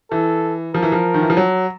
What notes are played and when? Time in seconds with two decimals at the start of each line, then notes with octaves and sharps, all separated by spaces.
0.11 E3 A4
0.74 F3 A#4
0.83 E3
0.92 F3
1.14 D#3
1.23 E3
1.30 F3
1.37 F#3